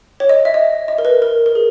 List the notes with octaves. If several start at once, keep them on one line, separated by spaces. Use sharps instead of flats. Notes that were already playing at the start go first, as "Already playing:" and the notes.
C#5
D#5
E5
D#5
D#5
A#4
B4
A#4
A#4
G#4